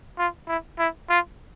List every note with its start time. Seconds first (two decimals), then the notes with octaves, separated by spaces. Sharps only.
0.18 F4
0.48 E4
0.79 E4
1.09 F4